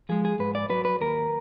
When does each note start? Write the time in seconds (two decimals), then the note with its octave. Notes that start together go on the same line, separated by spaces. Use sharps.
0.09 F3 G#3 G#4
0.25 G#4
0.39 G#2 B4
0.55 D5
0.70 F#3 B4
0.85 B4
1.01 D#2 A#4